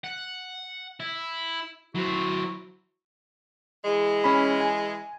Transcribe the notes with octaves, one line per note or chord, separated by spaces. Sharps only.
F#5
E4
F#3 E4 F#4 C5
E3 G#3
C#4 B5
G#5